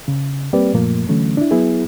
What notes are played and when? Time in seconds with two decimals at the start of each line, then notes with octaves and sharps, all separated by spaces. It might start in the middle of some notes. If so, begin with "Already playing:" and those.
0.08 C#3
0.53 G3 A#3 C4 G4 B4 D5
0.74 F#2 A#2 F3 A3 A#3
1.09 D3 E3 F#3 A3 C#4
1.37 D4 E4
1.51 F#3 B3 E4 G#4